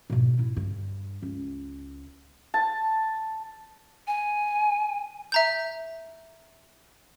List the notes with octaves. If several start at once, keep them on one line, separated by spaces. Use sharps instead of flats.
G#2 B2
E4
G2
C#2
A5
G#5
E5 A#5 G6